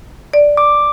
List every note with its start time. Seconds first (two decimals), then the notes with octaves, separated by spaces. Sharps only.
0.33 D5
0.57 D6